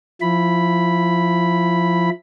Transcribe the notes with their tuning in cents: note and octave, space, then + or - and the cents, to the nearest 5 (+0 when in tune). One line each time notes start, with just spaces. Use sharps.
F3 +0 E4 +15 B5 +0